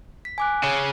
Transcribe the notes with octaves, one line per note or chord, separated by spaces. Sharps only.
B6
G#5 D6 F#6
C#3